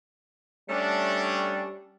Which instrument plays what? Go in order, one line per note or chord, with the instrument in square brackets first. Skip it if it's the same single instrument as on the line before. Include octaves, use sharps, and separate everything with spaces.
[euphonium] G3 [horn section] A3 C#4 D4